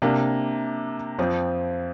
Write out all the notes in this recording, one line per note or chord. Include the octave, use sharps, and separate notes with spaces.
C3 A#3 D4
F2 F3 C4